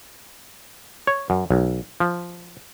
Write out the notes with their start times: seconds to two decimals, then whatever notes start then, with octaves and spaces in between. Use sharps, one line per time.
1.07 C#5
1.30 F#2
1.51 B1
2.00 F3